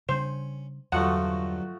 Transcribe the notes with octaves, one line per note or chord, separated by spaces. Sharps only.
C#3 G3 C#4 D4 C5
E2 G2 D3 F3 F#3 A3 F#4 F#5